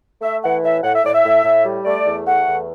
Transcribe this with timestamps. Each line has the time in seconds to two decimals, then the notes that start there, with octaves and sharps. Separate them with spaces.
0.22 A3 E5
0.42 E3 F#5
0.62 A2 E5
0.83 A2 F#5
0.94 E5
1.04 A2 D5
1.14 E5
1.25 A2
1.45 A2
1.65 G3
1.85 A3 D5
2.06 E2
2.26 A3 F#5
2.47 E2